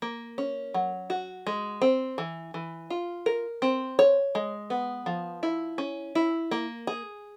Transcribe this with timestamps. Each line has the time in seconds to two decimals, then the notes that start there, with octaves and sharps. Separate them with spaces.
0.02 A#3
0.38 C#4
0.74 F#3
1.10 F#4
1.47 G#3
1.82 C4
2.18 E3
2.54 E3
2.90 F4
3.26 A#4
3.62 C4
3.99 C#5
4.35 G#3
4.70 B3
5.06 F3
5.43 E4
5.78 C#4
6.15 E4
6.51 A#3
6.87 G#4